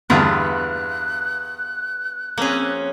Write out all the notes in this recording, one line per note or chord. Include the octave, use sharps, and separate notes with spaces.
E2 G2 D3 B3 F4 A#4 B4 F#6
F2 A#3 C4 C#4 G#4